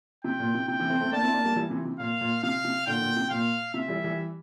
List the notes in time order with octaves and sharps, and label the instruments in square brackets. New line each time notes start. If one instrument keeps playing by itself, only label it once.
[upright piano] C3 [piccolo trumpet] G5
[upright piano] A#2
C3
[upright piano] C3 [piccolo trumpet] G5
[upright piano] C3 E3
A3 C4
A3 C4
[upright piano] A#3 D4 [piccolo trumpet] A5
[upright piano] C4 E4
A#3 D4
G3 A#3
E3 G3
C3 E3
C3
[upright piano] A#2 [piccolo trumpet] F5
[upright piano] A#2
[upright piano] C3 [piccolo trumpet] F5
[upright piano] C3
[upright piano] A#2 D3 [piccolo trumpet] G5
[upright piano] A#2 D3
C3
[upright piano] A#2 [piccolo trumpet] F5
[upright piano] C3 [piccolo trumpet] E5
[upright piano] E3 G3
E3 G3